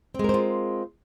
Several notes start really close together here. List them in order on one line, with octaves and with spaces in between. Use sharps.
C4 G#3 A#4 C5 F4